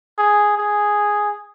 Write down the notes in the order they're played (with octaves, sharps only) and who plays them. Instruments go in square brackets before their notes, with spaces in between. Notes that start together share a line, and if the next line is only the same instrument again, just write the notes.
[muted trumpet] G#4
G#4